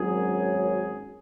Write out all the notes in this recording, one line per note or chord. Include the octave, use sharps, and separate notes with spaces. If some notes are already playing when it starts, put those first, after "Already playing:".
Already playing: G#1 F#2 F#3 C#4 G#4